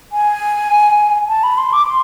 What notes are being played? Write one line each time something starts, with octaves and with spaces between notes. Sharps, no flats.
G#5
A5
B5
C6
D6
C6